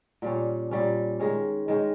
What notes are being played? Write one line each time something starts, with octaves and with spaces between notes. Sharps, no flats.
A#2 G3 C#4
A#2 G3 C#4
D#3 G#3 C#4
D#3 G#3 C#4